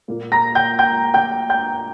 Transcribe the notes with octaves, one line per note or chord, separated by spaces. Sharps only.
A#2 A#3
A#5 A#6
G5 G6
G5 G6
G5 G6
G5 G6